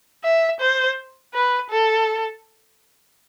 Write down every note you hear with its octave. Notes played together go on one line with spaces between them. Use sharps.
E5
C5
B4
A4